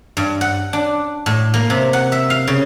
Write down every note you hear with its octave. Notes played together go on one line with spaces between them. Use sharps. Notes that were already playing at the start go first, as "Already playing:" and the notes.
G2
F#5
D4
A2
A#3
C3
F#5
E5
F5
C#3